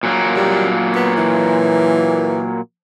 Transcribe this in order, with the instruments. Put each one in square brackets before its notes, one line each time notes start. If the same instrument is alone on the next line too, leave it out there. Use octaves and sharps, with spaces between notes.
[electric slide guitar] A#2 F#3 A#3
[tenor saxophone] G3
B3
E3